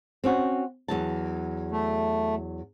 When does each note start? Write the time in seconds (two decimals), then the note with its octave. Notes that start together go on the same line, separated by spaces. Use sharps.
0.24 C4 C#4 F#4
0.88 E2 F#3 A5
1.71 A3